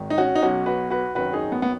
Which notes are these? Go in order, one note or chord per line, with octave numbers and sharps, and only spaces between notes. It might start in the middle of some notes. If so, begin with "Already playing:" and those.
Already playing: G#1 G#2 D#3
D#4
C#4 F#4
D#4
B1 B2 F#3 C#4 F#4
F#4 B4
F#4 B4
G#1 F#2 D#3 F#4 B4
D#4 G#4
B3
B3